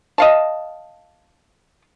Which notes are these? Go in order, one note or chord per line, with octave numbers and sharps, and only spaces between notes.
D#5 F5 A5